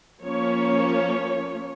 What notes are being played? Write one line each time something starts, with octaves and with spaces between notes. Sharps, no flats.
F3 A#3 C#4 C#5